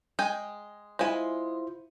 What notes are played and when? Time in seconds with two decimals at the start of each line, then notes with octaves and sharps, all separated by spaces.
0.19 G#3 G5 G#5
0.99 G#3 E4 F4 C5 G#5